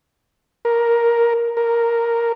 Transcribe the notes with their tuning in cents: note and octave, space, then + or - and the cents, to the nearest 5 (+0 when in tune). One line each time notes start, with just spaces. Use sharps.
A#4 +10
A#4 +0